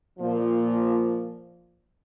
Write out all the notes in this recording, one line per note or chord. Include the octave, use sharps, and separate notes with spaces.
A#2 F3